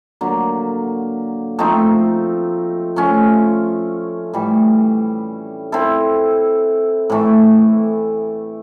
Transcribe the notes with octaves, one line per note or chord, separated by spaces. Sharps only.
D3 F#3 A#3
F3 A3 C4 D#4
F3 A3 C#4
A2 E3 G3
C4 E4 A4
A2 E3 A3